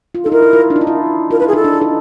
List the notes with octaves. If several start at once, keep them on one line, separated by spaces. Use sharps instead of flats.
F4
D#4 A4
E4 A#4
E4
F4
D4
D#4
F4
E4
F4 A#4
B4
E4
G#4
D#4 A4
D4
D#4